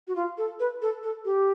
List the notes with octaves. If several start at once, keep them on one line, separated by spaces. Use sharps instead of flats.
F#4
F4
A4
B4
A4
A4
G4